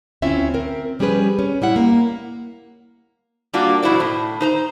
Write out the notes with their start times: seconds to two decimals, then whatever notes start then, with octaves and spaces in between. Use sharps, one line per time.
0.22 D2 C4 C#4 E4 F4 E5
0.54 C4 A#4
0.99 F3 G3 C#4 G4 G#4 B4
1.39 C#4
1.61 A#2 G3 E4 F#5
1.76 A#3
3.53 G3 A#3 D4 F4 F#4
3.82 F2 B2 E4 F#4 C5 D5
4.00 A2
4.41 D#4 C5 A#5